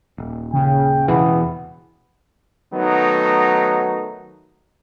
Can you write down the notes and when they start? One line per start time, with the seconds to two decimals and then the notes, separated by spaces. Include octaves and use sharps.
0.18 D#1
0.53 C#3 G5
1.08 E2 B2 E3 B3
2.73 D#3 F#3 A3 B3 D#4